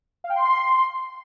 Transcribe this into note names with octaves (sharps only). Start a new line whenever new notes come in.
F5
G5
C6